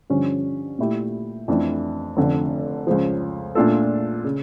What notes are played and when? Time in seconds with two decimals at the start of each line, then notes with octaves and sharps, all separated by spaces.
0.10 G2 D3 F3 C#4
0.79 A#2 A3 E4 G4
1.48 F2 E3 A3 D4
2.17 F1 F2 D3
2.87 C#2 C#3 F3
3.55 A#2 A3 D4 F4 A4
4.24 C#3